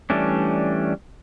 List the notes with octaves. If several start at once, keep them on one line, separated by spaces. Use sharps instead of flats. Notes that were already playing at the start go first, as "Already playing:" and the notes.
E3 G3 A3 C#4 D4